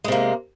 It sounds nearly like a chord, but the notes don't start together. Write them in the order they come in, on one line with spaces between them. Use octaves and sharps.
G#3 C3 A#3